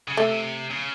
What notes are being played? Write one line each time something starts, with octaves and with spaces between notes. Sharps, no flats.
C#3
C3 A3
C#3